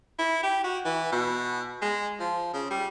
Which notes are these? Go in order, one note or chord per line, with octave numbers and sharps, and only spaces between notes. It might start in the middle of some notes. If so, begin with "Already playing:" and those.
E4
G4
F#4
E3
B2
G#3
F3
C#3
G3